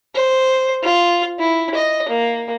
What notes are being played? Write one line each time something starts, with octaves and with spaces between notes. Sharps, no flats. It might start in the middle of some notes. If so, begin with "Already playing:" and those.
C5
F4
E4
D#5
A#3